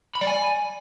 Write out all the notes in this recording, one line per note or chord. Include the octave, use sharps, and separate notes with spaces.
B5
D5
G#5